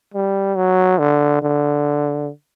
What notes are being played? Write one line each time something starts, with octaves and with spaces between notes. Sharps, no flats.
G3
F#3
D3
D3